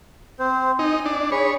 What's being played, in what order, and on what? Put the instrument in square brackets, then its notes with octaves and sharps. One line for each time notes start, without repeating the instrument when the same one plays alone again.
[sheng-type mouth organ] C4 C5
[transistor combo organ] D#4 [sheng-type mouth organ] G#5
[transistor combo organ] D4
[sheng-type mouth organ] G#4 B5 [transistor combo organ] C#5